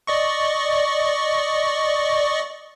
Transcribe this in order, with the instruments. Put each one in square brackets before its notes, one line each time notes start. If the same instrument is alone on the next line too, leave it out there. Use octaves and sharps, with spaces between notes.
[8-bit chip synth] D5 D#5 C#6